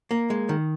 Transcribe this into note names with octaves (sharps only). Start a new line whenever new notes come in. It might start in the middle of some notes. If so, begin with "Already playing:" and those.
A#3
G#3
D#3